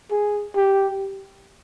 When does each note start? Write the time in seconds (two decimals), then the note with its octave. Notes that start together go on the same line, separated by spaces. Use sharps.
0.11 G#4
0.56 G4